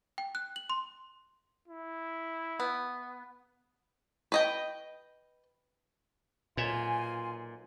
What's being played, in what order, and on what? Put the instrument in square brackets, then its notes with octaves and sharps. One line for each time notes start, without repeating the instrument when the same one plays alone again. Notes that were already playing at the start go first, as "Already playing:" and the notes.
[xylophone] G5
F#6
F#7
C6
[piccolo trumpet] E4
[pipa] B3
[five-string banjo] B4 D#5 G5
[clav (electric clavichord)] B1 C#5 E5 [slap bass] A#2 [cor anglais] F4 [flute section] G#5